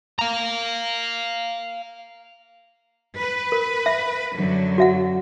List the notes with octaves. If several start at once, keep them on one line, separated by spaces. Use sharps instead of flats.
F5 A#5
B4
A#4
E5
F#2 D3 F#3
F#4 E5 F#5